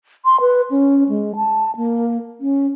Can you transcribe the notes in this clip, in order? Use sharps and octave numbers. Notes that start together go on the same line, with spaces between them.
C6
B4
C#4
G#3
A5
A#3
C#4